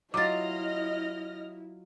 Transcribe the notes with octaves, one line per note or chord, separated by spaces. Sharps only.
F#3 E4 F4 D#5 D6 F6 A6 A#6